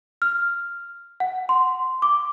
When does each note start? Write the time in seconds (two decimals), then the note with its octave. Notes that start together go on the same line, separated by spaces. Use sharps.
0.22 F6
1.20 F#5
1.49 C6
2.02 D6